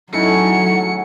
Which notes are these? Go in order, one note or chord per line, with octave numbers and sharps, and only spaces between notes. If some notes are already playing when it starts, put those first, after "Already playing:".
A2 C#3 F#3 D#4 E4 A4 C#7